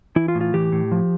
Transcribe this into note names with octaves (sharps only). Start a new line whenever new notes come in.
E3 E4
F4
A2
F4
E3 G4
A2
F3